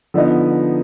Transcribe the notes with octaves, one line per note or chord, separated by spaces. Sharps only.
D3 F3 B3 D#4